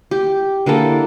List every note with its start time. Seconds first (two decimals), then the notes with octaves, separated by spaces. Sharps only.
0.11 G4
0.66 D3 A#3 E4 A4